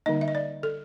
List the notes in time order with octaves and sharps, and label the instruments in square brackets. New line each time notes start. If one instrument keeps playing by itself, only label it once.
[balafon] D3 G3 A#3 D#4 D#5
E5
D#5
D5
A4